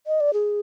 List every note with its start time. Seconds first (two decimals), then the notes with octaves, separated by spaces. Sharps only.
0.07 D#5
0.20 D5
0.33 G#4